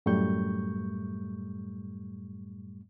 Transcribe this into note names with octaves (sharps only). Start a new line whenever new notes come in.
F#2 A2 G3 A3 C#6 G6